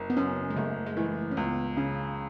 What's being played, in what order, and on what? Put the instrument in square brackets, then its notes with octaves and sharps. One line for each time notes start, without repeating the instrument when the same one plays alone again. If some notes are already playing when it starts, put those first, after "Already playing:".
Already playing: [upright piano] F#1
[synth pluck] B3
[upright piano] F#2 [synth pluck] C#4
[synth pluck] G#3
[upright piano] F#1 [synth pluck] A3
[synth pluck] G#3
[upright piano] E3 [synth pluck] A3
[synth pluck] C#4
[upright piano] C#2 [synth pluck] B3
[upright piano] C#3 [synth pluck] C#4